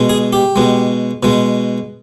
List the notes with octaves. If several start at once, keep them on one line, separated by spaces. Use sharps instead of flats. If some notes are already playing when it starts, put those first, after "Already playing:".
Already playing: B2 G#3
G#4
G4
B2 G#3
B2 G#3